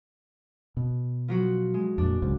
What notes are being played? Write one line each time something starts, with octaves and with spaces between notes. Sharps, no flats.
B2
F3 F#3 F#4
G#3
F2 A#2 D4
C#2 G#2 C#3